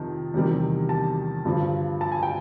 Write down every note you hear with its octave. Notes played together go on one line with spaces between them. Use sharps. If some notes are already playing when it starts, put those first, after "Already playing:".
Already playing: F2 C3 D#3 A5
E2 C3 D#3 G3
A5
G2 D3 F3
A5
G#5
G5